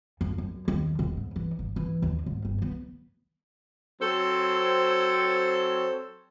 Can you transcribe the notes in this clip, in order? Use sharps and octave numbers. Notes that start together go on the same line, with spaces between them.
F2
F#2
D#2
E1
G#2
E3
G#1
E3
D#2
G#2
G1
B3
F#3 C4 A4 C5 C#5